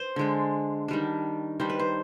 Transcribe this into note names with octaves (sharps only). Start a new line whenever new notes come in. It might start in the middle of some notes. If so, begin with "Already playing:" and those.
Already playing: C5
D3 G#3 D4
D#3 G3 D4
D#3 G3 D4 C5
B4
C5